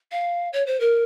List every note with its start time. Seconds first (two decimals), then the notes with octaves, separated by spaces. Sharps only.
0.12 F5
0.53 C#5
0.67 C5
0.80 A#4